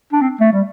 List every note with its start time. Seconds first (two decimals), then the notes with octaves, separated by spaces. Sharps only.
0.12 D4
0.22 C4
0.40 A3
0.53 G3